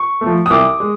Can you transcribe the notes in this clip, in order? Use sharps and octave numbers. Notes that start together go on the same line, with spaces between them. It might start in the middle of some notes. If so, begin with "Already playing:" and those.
Already playing: C#6
A3
F3
D#6
C2 D6
G#3